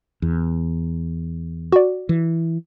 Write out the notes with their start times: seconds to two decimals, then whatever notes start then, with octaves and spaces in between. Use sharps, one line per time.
0.22 E2
1.72 F#4 D5
2.09 E3